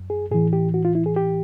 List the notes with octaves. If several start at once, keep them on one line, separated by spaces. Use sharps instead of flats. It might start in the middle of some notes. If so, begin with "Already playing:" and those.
Already playing: F#2
G#4
A2 E3 G#4
G4
F#4
F4
E4
G#4
G4